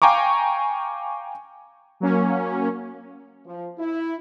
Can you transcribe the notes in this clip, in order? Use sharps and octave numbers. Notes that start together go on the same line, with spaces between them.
F5 G5 G#5 A#5 C#6 D6
F#3 A#3 C#4
F3
E4